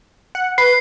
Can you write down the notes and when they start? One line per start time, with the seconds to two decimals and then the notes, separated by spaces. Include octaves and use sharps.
0.35 F#5
0.58 B4 C7